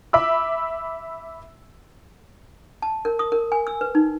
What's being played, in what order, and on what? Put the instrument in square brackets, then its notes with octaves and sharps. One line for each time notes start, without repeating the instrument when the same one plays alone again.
[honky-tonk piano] E5 B5 D6 E6
[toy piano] A5
A#4
D#6
A#4
G#5
E6
B4
D#4